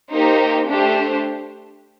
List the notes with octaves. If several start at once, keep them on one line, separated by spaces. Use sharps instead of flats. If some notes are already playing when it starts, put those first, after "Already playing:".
A#3 D#4 G4 C5
A3 D4 G4 C5